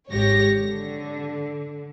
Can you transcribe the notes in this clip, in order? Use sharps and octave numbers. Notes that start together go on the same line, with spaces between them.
G#1 G#2 G4 C#5 A#6
D3